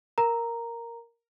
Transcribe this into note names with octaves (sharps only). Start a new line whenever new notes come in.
A#4 A#5